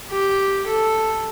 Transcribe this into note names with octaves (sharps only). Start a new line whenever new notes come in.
G4
A4